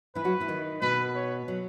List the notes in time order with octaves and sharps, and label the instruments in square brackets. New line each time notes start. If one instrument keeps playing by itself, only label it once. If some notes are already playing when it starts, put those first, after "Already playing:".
[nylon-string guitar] E3 E4 [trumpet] B4
[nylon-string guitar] F#3 F#4
E3 E4
D#3 D#4
[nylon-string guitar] B2 B3 [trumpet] B4
[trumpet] C#5
[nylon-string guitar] F#3